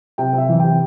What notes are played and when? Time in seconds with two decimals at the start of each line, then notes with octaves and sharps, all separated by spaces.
0.18 C3 G5
0.33 C3 E5
0.49 E3
0.60 C3 G5